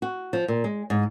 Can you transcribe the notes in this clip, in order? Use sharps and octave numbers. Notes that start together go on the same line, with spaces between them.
F#4
F3
A#2
G#3
G#2